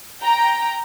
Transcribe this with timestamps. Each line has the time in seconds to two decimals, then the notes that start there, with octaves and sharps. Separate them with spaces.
0.22 G5 A#5